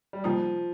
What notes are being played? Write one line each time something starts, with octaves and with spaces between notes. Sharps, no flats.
G3
C3 F3 G3 A#3 D#4